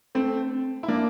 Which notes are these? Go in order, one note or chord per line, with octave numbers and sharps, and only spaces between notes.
A3 C4
E4
A#3 D4